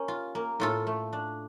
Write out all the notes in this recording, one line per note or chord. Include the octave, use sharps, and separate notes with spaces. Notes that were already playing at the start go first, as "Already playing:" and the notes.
Already playing: C#4 G4 A#4
F4
A#3
A2 F4 A4
A3
D4